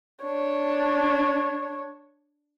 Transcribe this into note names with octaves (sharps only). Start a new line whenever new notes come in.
D4 C#5